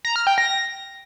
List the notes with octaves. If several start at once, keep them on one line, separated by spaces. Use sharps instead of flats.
A#5
F6
G5
A#6